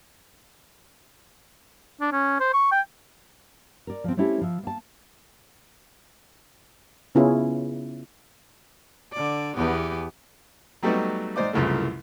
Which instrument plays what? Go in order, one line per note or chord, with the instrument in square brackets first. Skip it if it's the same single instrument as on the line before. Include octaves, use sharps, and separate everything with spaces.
[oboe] D4
C#4
C5
C#6
G5
[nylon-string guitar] A#4 D5
F3 C4
A3 C4 C#4 E4 G4 A4
F3 E5
A#3 A5
[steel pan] C#3 B3 C#4 E4 F4 G#4
[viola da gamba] D3 D5
E2 B3 G4
[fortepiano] F#3 G3 A3 B3 D#4 F#4
G#2 D#4 C5 D5 D6
C2 F#2 C#3 E3 F3 A3